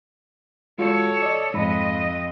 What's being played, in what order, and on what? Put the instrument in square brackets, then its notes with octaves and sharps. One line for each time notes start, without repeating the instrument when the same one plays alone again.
[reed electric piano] G#3 F4 F#4 [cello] A4 C#5
[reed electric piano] D5 D#5
[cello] F2 D#5 [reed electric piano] G#2 B5